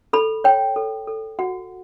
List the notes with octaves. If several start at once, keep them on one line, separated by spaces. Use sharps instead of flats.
A4 B5
C#5 G5
A4
A4
F#4 F#5